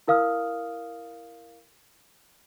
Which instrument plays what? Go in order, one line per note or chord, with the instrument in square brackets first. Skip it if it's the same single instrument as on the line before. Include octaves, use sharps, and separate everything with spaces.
[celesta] E4 A#4 F5 D#6 F6